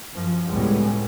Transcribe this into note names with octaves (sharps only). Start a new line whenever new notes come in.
F#2 F3
C#2 A2 G3 G#3 B3 C#4